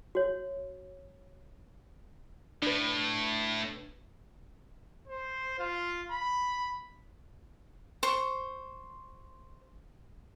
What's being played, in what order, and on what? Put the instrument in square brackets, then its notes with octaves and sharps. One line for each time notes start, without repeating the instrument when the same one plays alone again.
[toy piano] F#4 C#5
[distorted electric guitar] A2 [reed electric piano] D4 B4
[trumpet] C5
F4
B5
[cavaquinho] C5 C#6